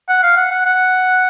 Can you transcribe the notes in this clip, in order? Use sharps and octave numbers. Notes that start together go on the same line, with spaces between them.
F#5
F5
F#5
F#5
F#5